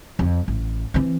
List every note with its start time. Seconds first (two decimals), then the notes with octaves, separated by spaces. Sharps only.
0.19 F2
0.48 A1
0.94 E3 C4